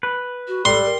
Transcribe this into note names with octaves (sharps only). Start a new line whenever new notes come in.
B4
F#4
G3 A4 C6
A#4